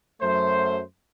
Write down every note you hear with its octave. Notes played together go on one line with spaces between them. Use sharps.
F#2 F#3 A3 C5